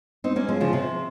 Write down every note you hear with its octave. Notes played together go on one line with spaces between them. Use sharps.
C4 D#4
A#3 C#4
F3 G#3
C#3 F3
C3